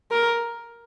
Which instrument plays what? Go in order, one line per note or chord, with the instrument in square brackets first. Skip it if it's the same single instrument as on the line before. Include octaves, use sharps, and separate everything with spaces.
[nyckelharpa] A#4